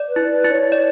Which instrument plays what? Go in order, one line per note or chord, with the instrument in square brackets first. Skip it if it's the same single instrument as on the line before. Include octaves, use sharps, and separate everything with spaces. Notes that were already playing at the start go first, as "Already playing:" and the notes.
Already playing: [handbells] D5
[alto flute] B4
[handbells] E4
[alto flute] B4
[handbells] E4
[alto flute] C#5
[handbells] D5